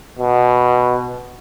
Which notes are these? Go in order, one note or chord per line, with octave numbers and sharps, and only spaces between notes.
B2